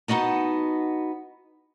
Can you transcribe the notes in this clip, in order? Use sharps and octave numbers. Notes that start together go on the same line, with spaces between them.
B3 D#4 F#4 D#5 A5